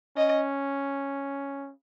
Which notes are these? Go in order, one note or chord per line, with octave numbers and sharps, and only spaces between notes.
C#4 D#5